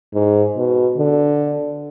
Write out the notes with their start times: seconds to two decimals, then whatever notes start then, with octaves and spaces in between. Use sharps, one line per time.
0.14 G#2
0.57 B2
0.97 D3